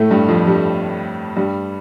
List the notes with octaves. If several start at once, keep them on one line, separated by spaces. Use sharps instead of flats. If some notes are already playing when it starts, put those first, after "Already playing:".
Already playing: A2 A3
G2 G3
F2 F3
G2 G3
G2 G3